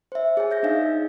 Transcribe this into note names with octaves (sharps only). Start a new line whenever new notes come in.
C5 E5
G#4 C#5 G#5
E5 G6 A#6
D4 D#4 D#5 F5